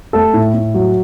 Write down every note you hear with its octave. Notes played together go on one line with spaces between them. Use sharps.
A3 A4
A2
A2
F#3